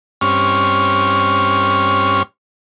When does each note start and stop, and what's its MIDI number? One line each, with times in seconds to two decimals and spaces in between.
0.21 2.23 43
0.21 2.23 60
0.21 2.23 61
0.21 2.23 85
0.21 2.23 89